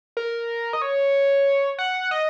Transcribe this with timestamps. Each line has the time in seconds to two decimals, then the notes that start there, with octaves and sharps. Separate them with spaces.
0.17 A#4
0.73 D#5
0.82 C#5
1.79 F#5
2.11 D#5